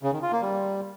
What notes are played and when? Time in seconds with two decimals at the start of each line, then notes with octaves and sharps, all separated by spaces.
0.03 C#3
0.13 D#3
0.22 F4
0.32 A#3
0.42 G3